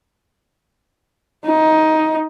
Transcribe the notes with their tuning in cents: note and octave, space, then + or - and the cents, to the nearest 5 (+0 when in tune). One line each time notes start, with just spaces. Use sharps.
D#4 +15